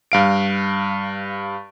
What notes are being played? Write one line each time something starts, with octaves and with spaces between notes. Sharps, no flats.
G2 F5 D7